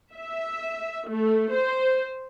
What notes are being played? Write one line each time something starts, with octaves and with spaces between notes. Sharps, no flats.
E5
A3
C5